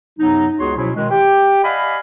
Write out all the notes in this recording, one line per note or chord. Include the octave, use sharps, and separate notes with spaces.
F#2 C3 F#3 B3 D#4
C#2 B3 F#4 G#4 C#5 C6
B2 F3 F#3 C#4 E4
B2 D#3 G#3
G4 G5
D5 D#5 F5 F#5 G#5 B5